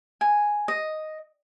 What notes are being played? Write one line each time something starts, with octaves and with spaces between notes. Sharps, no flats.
G#5
D#5